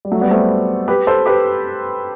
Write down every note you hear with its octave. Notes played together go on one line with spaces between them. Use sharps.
G3
F#3 A3
G3 B3
A3 C4
G4 B4
A4 C5
G4 B4